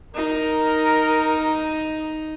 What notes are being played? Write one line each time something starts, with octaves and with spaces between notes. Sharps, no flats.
D#4 A#4